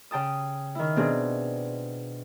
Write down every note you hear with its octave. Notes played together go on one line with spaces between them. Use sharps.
C#3 G5 A5 D#6
D#3 E4
B2 C4 D4 G#4